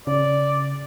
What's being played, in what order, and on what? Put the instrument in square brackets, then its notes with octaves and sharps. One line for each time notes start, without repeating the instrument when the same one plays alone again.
[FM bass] C#3 [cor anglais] D5